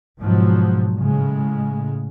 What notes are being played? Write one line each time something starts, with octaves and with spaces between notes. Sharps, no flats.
G#2 B2 F3 F#3
A2 C#3 G#3